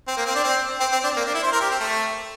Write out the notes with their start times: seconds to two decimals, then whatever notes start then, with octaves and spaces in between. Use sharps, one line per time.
0.08 C4
0.17 A#3
0.26 C4
0.35 D4
0.44 C4
0.80 C4
0.92 C4
1.04 D4
1.16 A#3
1.26 D4
1.34 E4
1.43 C5
1.52 A#4
1.61 G4
1.71 C4
1.80 A3